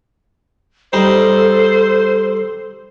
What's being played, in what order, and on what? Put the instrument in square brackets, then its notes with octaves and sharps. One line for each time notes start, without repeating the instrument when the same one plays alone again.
[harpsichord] G3 D#4 [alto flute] A4 [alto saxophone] C5